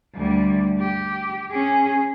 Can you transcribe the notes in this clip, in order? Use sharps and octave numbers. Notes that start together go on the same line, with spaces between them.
D2 G3
G4
C#4 G#4